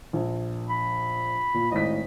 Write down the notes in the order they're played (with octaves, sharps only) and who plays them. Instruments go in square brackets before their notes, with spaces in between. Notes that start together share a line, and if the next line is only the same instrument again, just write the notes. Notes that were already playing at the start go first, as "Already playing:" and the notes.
[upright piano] A#1
[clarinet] B5
[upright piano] A#2
[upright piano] G#1 A2 B6 [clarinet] D#5